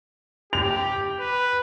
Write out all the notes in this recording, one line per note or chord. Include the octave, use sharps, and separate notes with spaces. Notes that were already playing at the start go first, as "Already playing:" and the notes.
G4 F7
B4